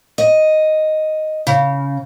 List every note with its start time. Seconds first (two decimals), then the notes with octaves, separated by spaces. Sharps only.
0.18 D#5
1.47 C#3